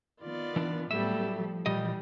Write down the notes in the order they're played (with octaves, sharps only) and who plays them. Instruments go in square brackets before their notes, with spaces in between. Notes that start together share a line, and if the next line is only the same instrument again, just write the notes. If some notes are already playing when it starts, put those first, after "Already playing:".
[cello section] D#3 B3 [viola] F4 D5
[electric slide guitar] E3 D4
[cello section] A2 B3 [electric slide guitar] F#3 E5 [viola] G3 A4
[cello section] F3
[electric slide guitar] A#2 F3 D#5 [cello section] E3 [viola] G3